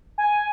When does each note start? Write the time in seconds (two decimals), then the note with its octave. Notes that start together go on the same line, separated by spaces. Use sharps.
0.18 G#5